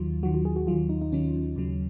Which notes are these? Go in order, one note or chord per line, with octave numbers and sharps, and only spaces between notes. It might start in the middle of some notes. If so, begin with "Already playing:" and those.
Already playing: D#2 D#3 F#3 F4
D#2 D#3 F#3 F#4
F#4
G#4
F#4
D#2 D#3 F#3 F4
D#4
D#4
D#2 D#3 F#3 C#4
D#2 C#3 F#3